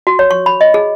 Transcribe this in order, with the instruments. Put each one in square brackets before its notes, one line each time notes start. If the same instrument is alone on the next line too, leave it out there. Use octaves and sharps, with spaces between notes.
[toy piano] F#4
C#5
C#6
B5
D#5
G#4